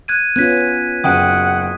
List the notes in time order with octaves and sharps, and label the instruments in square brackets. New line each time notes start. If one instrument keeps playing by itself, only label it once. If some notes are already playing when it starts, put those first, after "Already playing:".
[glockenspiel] F#6 G#6 D#7
[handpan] B3 C#4 F4 [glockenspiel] F#6 G#6 B6
[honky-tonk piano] F#1 G5 D#7 [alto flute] F#5 [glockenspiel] D#6